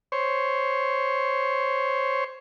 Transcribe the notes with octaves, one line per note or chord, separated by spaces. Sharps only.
C5 C#5